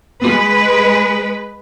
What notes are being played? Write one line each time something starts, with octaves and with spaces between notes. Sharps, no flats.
G#3 B4